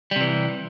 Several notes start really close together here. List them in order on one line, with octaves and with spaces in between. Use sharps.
G3 C3 E3